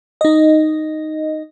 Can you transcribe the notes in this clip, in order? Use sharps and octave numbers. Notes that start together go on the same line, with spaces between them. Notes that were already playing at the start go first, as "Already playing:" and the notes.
D#4 D#5